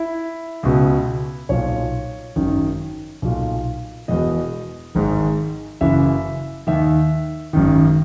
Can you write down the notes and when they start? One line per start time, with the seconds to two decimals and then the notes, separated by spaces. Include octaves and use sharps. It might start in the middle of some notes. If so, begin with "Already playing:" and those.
Already playing: E4
0.63 C#2 B2
1.49 B1 A#2 C#5
2.36 G#1 F#2 D#3
3.22 B1 A#2
4.08 E1 E2 B2 D#5
4.95 G#1 G#2 D#3
5.81 F#1 F#2 E3 E5
6.67 D#2 D#3 E5
7.53 G#1 F#2 D#3